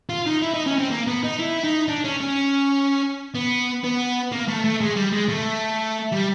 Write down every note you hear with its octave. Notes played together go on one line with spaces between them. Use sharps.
F4
D#4
E4
D#4
C#4
C4
A#3
B3
D#4
E4
D#4
D4
C#4
C#4
B3
B3
A#3
A3
A3
G#3
G3
G#3
A3
G3